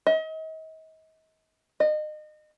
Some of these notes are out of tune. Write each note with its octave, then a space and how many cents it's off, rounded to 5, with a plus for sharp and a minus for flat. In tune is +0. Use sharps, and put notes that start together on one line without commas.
D#5 +40
D#5 -30